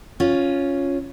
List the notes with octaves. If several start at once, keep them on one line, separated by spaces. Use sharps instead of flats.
C#4 F4